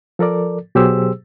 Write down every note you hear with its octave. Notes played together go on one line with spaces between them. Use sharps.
F3 A4 A#4 D5
B2 F#3 G4 G#4 C5 E6